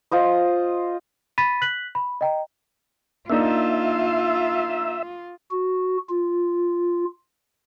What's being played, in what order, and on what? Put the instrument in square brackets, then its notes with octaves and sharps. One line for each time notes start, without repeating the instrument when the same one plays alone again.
[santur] F4 C5 D#5
[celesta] B5 A6 B6 D#7
F#6 B6 F#7
B5
D#5 G5 A#5
[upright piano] A#3 D4 D#4 [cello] F4 [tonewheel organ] E5
[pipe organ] F#4
F4